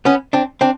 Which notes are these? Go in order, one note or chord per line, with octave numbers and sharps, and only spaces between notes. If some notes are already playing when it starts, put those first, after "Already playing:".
B3 C#4
C4 D4
C4 D4